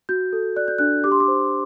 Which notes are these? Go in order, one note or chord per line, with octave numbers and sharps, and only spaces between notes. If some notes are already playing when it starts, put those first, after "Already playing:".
F#4 G6
A4
D5 F#6
G6
D4 F#6
G4 D6
C6
D6
C5